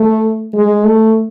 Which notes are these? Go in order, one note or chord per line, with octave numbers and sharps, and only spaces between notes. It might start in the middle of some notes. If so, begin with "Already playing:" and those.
Already playing: A3
G#3
A3